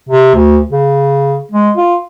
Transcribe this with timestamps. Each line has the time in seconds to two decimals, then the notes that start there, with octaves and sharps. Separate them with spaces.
0.09 C3
0.35 D2
0.72 C#3
1.52 G#3
1.77 F4